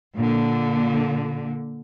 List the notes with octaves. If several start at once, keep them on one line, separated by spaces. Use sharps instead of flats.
A#2 D3